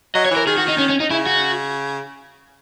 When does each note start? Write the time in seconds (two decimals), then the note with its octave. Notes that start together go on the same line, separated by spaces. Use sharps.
0.15 F#3 D#5
0.26 C#5
0.31 E3
0.36 A#4
0.47 D#3 G#4
0.58 F#4
0.68 D#4
0.78 C#4
0.89 C#4
1.00 D#4
1.10 C#3 E4
1.26 F#4